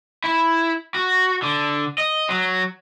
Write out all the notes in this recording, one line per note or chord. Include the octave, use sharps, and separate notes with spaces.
E4
F#4
D3
D#5
F#3